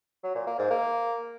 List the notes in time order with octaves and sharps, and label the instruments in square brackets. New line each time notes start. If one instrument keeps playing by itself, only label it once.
[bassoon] F#3
A#2
A#3
G#2
A#3